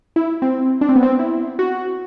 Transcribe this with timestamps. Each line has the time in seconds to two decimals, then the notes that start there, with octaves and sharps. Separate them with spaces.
0.16 E4
0.42 C4
0.81 D4
0.89 C4
0.96 B3
1.03 C4
1.19 E4
1.59 F#4